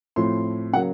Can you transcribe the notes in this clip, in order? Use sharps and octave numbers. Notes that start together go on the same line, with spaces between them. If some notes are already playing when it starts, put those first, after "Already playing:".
A2 F3 A3 C4 F4 C6
C#3 F#3 A#3 F#5